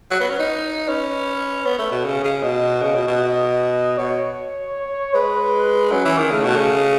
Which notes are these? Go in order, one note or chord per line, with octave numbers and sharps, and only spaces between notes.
F#3
B3
C#4
D#4
C#4 B4
B3
A3
B2
C#3
C#3
B2 D#5
C#3
B2
B2
D#5
B2 C#5
G#3 B4
F#3 C#4
E3
D#3
C#3 A3
B2
C#3